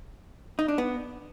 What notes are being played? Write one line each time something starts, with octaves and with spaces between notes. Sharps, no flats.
D#4
D4
B3